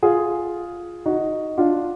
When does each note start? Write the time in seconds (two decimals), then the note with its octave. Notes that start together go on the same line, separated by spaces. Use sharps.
0.03 F4 G#4
1.06 D#4 F#4
1.57 D4 F4